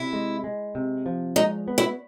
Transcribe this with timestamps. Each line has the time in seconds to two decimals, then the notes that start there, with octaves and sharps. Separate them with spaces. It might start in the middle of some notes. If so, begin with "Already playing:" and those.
Already playing: C3 E4
0.13 G#3
0.44 G#3
0.75 C3
1.06 F3
1.36 G#3 D#4
1.68 B3
1.78 E4